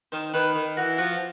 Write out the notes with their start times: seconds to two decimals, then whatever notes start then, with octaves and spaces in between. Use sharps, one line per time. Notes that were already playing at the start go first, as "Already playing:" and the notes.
0.12 D#3 C5
0.34 D#3 B4
0.55 D#3
0.77 E3 F#4
0.98 F3 F#4